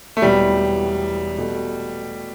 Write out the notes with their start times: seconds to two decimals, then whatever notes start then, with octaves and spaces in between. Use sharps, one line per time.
0.17 A3
0.22 E1 E2 B2 G3 B3 E4
1.38 B2 A3